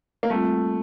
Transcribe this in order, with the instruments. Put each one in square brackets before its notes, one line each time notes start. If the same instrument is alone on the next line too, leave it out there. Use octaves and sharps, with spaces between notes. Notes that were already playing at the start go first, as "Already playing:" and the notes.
[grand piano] A#3
[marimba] G3 C4 F4 [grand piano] A3